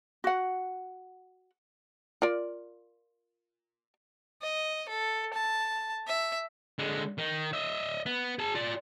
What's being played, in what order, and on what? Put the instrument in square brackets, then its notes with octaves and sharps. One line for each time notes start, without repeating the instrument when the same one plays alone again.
[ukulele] F#4 F#5
[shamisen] F4 A#4 D5
[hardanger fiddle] D#5
A4
A5
E5
[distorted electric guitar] D3 G#3
D#3
D#5 E5
B3
G#4 A5
F4 D5